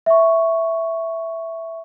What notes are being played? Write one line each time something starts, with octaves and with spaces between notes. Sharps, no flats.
E5 C#6